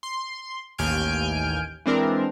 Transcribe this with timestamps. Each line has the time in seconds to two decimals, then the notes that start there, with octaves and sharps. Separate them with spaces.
0.03 C6
0.78 A1 D#2 G#5 F6 G6 D7
1.86 E3 G#3 C4 D4 A#4